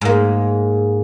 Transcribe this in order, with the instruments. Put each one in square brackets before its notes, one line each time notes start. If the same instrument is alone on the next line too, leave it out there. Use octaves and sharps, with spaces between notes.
[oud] G#2 A#3